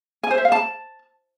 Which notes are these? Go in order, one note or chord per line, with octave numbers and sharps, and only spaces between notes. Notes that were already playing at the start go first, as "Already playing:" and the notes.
G#5
C5
E5
F5
A5